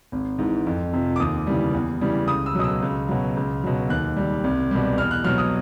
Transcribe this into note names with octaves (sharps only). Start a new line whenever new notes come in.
G#1
G#2 E3
F2
C3 F3
D6
D#2 D#6
C#3 E3 G3
E2
C#3 E3 G3
C#2 D#6
E6
B2 F#3 D#6
E6
C#2
B2 F#3
C#2
B2 F#3
D#2 F#6
D#3 G3
C2
B2 G3
E2 F6
F#6
B2 F#3 F6
D#6